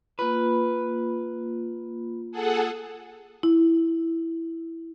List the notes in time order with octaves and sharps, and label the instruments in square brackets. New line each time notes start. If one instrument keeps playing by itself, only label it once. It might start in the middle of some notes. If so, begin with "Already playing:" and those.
[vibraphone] A#3 F4 [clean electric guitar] B4
[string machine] G#4 A4 F#5
[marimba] E4